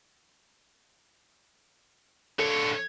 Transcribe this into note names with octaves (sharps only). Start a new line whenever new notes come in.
D3 A4 C#5